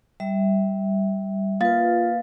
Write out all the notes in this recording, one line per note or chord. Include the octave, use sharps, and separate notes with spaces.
G3 E5
A#3 F4 B4 F5 A6